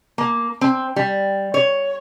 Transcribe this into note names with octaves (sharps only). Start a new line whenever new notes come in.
A#3
C4
G3
C#5